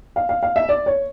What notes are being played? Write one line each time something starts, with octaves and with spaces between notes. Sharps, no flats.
F5
F5
F5
E5
D5
C#5